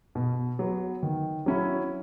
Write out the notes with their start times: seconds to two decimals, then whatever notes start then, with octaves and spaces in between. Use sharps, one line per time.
0.15 B2
0.59 F#3 B3
1.03 D#3
1.46 F#3 C#4 E4